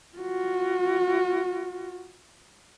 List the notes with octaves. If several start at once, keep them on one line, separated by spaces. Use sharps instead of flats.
F4 F#4